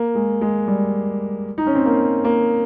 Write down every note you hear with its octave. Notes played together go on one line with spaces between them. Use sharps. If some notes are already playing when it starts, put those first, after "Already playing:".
Already playing: A#3
G#3
G#3
G3
D#4
C#4
C4
A#3
A#3